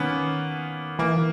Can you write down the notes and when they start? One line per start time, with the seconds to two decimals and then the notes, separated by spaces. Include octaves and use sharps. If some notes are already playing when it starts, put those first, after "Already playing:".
Already playing: D#3 A#3 B3 C#4
0.99 E3 A#3